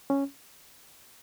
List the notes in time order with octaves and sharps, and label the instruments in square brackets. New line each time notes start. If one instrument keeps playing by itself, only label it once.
[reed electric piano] C#4